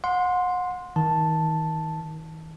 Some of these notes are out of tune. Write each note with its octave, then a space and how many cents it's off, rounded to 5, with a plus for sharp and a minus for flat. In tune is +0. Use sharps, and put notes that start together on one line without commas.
F#5 -35 C6 +0
D#3 +35 A5 +0